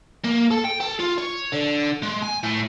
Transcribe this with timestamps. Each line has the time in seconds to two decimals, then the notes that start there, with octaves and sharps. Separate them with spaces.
0.25 A#3
0.52 A4
0.65 G5
0.81 A4
1.00 F4
1.18 C#5
1.53 D3
2.03 G#3
2.23 G#5
2.44 A2